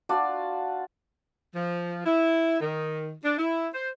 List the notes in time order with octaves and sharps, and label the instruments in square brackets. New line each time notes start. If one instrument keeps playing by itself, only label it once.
[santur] D4 F4 F#4 D5
[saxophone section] F3
E4
D#3
D4
E4
C5